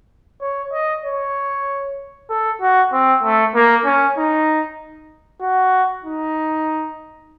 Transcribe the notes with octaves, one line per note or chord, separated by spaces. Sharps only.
C#5
D#5
C#5
A4
F#4
C4
A3
A#3
C#4
D#4
F#4
D#4